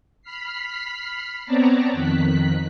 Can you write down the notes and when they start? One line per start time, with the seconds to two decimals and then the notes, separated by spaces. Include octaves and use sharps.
0.22 B5 F6 B6 C7
1.45 B3 C4 C#5 D5 A5 A#5
1.93 F2 D#3 F#6 B6